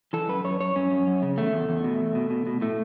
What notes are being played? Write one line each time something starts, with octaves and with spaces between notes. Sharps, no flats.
E3 A4
F#2 B4
F#2 C#5
F#2 C#5
F#2 C#4
F#2
F#2
C#3
E2 A3
E2
E2
B2
E2
B2
B2
B2
A2 A3